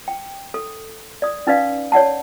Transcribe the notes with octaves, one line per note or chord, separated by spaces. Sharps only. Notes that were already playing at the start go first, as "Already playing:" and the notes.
G5
A4
D5 D#6
C#4 D#4 B4 D5 F5
C#5 D5 F#5 A5